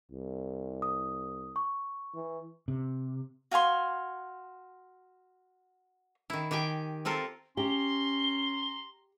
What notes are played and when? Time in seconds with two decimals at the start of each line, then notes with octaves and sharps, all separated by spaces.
0.12 C2
0.82 D#6
1.56 C#6
2.14 E3
2.68 C3
3.51 F#4 F5 G#5 C6
6.30 D#3 E4
6.51 D#3 G4 G5 G#5
7.05 C4 F4 A4 A#4
7.57 C#4 G4 A#5 C6 G7